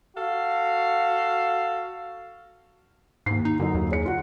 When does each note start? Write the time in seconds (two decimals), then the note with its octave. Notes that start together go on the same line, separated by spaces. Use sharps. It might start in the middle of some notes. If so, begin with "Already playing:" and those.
0.17 F#4 A4 F5
3.26 D#2 G#2 C7
3.45 D#4
3.60 F#2 D3 D#4
3.74 D#2
3.91 G#4 C#5 C#7
4.05 F4 F#4